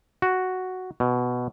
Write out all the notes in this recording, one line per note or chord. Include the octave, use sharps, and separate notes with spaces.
F#4
B2